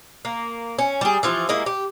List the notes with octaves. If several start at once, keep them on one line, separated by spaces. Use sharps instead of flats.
A#3
C#4
G3 G#4
E3 F3 F4
G#3 A#3 E4
G4